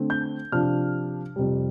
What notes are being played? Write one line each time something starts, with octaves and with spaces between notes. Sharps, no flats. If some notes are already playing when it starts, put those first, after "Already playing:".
Already playing: D3 A3 C4
G6
C3 F3 D4 F6
F2 C3 G3